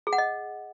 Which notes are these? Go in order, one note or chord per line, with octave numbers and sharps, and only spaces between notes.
G#4
F#5
D#5